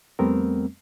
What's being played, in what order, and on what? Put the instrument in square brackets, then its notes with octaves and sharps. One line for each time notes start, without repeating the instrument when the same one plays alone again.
[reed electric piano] F2 G3 A3 B3 C4 A#4